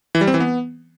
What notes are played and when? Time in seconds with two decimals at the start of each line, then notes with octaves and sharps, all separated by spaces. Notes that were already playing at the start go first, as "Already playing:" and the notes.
0.15 E3
0.21 G3
0.27 C4
0.34 E3
0.40 B3